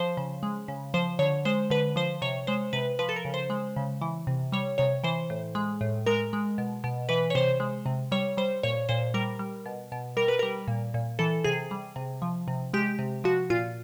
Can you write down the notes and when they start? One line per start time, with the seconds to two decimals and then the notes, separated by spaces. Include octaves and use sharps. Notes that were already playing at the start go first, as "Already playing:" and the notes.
Already playing: F3 C5
0.17 C#3
0.43 G#3
0.68 C#3
0.94 F3 C5
1.19 D3 C#5
1.45 G#3 C5
1.70 D3 B4
1.96 F3 C5
2.22 C3 C#5
2.47 G#3 C5
2.73 C3 B4
2.99 F3 B4
3.09 A4
3.16 A#4
3.25 C#3
3.34 C5
3.50 G#3
3.76 C#3
4.01 E3
4.27 C3
4.52 G3 C#5
4.78 C3 C#5
5.04 E3 C5
5.30 A2
5.55 G#3
5.81 A2
6.06 G#3 A#4
6.33 G#3
6.58 B2
6.84 B2
7.09 E3 B4
7.30 C#5
7.35 C3 C5
7.60 G#3
7.86 C3
8.12 G3 C#5
8.37 G3 C5
8.63 A#2 C#5
8.89 A#2 C5
9.14 G3 A#4
9.39 G3
9.66 B2
9.92 B2
10.17 G3 A#4
10.28 B4
10.39 G3 A#4
10.68 A#2
10.94 A#2
11.19 E3 A4
11.44 C3 G#4
11.71 G3
11.96 C3
12.22 F3
12.48 C3
12.74 G#3 G4
12.99 C3
13.24 F3 F#4
13.50 A#2 F4